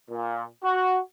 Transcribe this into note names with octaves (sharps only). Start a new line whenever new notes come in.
A#2
F#4